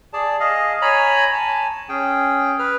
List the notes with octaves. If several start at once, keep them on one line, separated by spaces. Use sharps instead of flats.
G#4 D5 A5
G#4 D#5 F5
C#5 G#5 A#5 B5
G#5 A5
C#4 G#4 G5
B4 F6